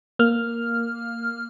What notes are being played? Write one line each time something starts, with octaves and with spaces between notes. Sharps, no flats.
A#3 F6